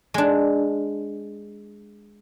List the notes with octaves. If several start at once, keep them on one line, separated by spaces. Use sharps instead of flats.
G#3 D4